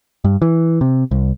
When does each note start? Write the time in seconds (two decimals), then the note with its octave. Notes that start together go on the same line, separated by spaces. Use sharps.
0.24 G2
0.42 E3
0.81 C3
1.11 C2